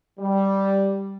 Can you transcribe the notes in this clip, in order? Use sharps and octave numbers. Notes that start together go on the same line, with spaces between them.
G3